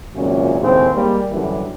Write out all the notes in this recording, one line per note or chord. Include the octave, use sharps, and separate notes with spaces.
G#1 C#2 F#2 A#2 C#4
D#2 A2 C#3 G#3 C4
G3 G#3 A#3
F#2 D3 E3 G3